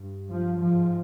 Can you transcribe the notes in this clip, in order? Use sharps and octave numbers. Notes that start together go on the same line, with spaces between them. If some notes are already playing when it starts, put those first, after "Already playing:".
Already playing: G2
F3
G#2 F3